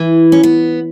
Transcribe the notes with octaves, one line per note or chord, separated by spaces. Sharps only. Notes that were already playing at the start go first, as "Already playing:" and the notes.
Already playing: E3
C#4
B3